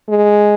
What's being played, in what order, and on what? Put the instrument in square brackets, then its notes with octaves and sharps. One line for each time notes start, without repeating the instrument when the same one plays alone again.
[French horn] G#3